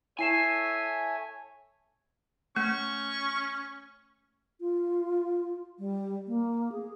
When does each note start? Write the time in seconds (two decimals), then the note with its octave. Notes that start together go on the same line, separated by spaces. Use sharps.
0.19 E4 A4 C#5 E5 G#5 C7 E7
2.56 A3 C#4 C#6
4.61 F4
5.79 G3
6.28 A#3
6.72 G#4